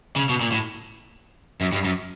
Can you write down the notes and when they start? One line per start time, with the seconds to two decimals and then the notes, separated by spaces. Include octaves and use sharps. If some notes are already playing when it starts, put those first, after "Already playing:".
0.16 C#3
0.29 B2
0.41 A#2
0.52 A2
1.61 F#2
1.73 G2
1.85 F#2